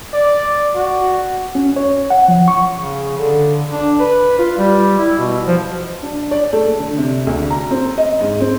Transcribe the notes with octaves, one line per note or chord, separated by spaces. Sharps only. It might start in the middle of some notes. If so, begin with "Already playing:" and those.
D5
F#4
C#4
C#5
F#5
F3
C#6
C#3
D3
D4
B4
F4
G3
E4
B2
F3
D4
D5
A3
D3
C3
D2
A#5
C4
D#5
G#2
C4